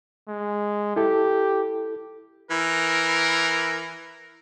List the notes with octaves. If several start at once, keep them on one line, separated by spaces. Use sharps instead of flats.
G#3
E4 G4 A4
E3 A#4